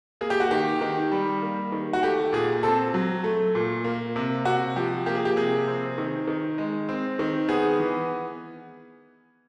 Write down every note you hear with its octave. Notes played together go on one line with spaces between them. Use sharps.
A#3 G#4
G4
F#4
D#3 G4
D#3
G3
A#3
D#3
F#4
A3 G4
A#2 G#4
C4 A4
F#3
A3
A#2
A#3
C3
C3 F#4
F3 G4
A#3 G4
G#4
G4
C3 G#4
C4
D#3
D#3
G#3
C4
D#3
B3 G#4
E3